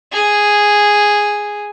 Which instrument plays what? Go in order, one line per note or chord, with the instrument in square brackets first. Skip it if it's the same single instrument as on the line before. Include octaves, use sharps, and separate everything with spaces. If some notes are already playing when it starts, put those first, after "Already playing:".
[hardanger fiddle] G#4